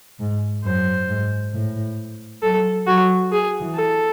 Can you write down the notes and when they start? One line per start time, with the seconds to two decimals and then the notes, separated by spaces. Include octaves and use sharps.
0.19 G#2
0.64 F#2 C5
1.08 G#2
1.53 A2
2.43 F#3 A4
2.87 F#3 F#4
3.32 G#4
3.61 E3
3.75 A4